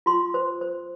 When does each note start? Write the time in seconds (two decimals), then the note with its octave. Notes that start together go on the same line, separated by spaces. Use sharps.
0.06 F4 C6
0.34 C5
0.61 C5